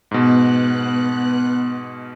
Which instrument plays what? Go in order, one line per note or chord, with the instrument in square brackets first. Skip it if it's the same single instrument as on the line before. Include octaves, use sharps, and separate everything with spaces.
[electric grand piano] G#2 B2 [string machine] B3 F#6